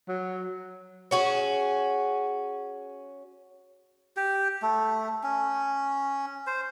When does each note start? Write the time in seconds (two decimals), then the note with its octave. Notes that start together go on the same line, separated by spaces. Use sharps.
0.08 F#3
1.11 C#4 F#4 G#4
4.17 G4
4.62 A3
5.23 C#4
6.47 C5